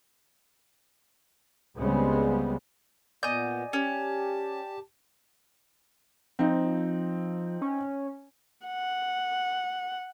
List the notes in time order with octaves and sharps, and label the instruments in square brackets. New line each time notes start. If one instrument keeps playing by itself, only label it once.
[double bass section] C#2 C#3 G3 G#3 B3 C4
[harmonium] A#2 B3 [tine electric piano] D5 G#5 [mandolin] D#5 G6
[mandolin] C#4 [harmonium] G4 A5
[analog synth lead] F3 [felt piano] C4 D#4
[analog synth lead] C#4
[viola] F#5